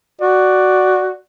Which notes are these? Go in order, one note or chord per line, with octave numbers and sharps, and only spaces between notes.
F#4 D5